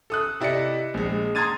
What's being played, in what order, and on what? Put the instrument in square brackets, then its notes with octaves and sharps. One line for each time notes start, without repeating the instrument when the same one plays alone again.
[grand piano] A4 D#6 F#6
C3 E4 D5 D#5 C#7
A#1 G#3
A#5 C6 D#6 G#6 A6 D#7